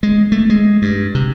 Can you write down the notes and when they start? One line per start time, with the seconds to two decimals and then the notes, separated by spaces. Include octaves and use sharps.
0.03 G#3
0.32 A3
0.50 G#3
0.82 G2
1.15 C3